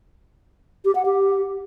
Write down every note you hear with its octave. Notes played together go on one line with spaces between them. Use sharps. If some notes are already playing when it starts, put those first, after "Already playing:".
G4
F#5
G4